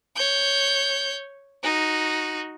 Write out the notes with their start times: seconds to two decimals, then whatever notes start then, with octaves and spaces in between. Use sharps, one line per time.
0.16 C#5 G6
1.63 D#4 F#4